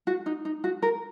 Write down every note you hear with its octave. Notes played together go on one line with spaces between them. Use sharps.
F#4
D#4
D#4
F#4
A#4